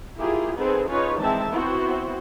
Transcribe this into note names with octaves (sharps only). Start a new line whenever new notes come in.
A#3 E4 F4 G4 G#4
B3 C4 D#4 G#4 A4 B4
C#4 D#4 F4 G#4 B4 C#5
D#3 E3 G#3 C4 E5 A5
B3 C4 E4 F#4 C5